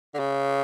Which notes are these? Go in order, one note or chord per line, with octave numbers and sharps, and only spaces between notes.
D3
C#3